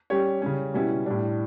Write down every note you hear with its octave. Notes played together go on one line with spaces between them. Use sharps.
G3 C#4 G4 C#5
C#3 G3 C#4
B2 G3 C#4 E4
A2 G3 D4